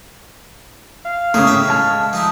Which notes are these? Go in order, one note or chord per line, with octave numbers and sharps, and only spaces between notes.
F5
A2 C#3 A3 A#3 G#4
E5 G5
G#3 A5 F6
F3 D#4 E4